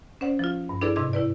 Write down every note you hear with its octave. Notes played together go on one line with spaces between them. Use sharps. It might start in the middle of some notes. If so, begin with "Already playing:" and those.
C#4 C5 D5 F#5
F3 F4
G2
D4 E4 G#4 A4 B4 D5
G#2 C3 D4 D#5 D6 G#6
E4 B4 D5